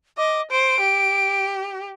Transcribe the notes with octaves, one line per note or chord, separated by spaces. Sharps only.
D#5 D6
C5 D7
G4